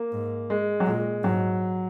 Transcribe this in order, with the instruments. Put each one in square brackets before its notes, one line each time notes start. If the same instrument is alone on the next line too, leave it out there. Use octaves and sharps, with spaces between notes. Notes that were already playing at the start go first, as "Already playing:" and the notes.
Already playing: [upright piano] A#3
[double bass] G#2
[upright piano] G#3
F#3
[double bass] A#2 [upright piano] G#3
[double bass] G#2 [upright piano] F#3